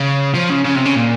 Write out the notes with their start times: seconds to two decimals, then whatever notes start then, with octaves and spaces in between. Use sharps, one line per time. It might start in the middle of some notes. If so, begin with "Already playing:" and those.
Already playing: C#3
0.34 F3
0.50 C#3
0.65 C#3
0.75 C3
0.85 C#3
0.95 A#2